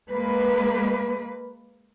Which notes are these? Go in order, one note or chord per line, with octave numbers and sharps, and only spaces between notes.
G#3 A#3 B4